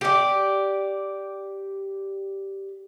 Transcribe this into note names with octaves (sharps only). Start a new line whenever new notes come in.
G4 D5